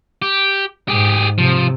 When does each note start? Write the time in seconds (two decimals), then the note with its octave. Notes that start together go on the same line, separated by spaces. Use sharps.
0.22 G4
0.88 G#2 G4 G#4
1.38 C3 F3